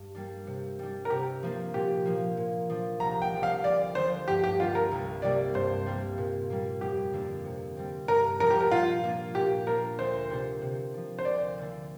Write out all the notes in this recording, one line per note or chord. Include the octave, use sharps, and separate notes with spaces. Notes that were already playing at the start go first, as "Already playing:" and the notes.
Already playing: G2
G3 A#3 D4
C3
G3 D4
A#4
C3 G4
F3 A#3 D4
A#2 G4
F3 A#3
A#2
F3 D4
C2 A#5
G5
C3 F3 D4
F5
D2 D5
D3 F3 D4 C5
G2 G4
G4
G3 A#3 D4 F4
A#4
C2
C3 G3 A#3 D4 D5
G2 C5
G3 A#3
A#2
G3 A#3
F2 G4
D3 A#3 D4
C3
G3 C4
G2 A#4
F3 D4 A#4
G4
A#4
A#2 F4
A#3 D4
A#2 G4
A#3 D4 A#4
D2 C5
C3 A#3 D4
C3
F3 D4
C5
D2 D5
D3 A#3 D4